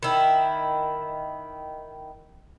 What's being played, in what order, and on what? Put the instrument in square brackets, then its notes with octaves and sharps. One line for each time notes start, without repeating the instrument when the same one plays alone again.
[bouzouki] D#3 E4